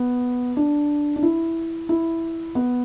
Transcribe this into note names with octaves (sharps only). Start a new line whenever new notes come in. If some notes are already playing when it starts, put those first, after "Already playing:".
Already playing: B3
D4
D4
E4
E4
B3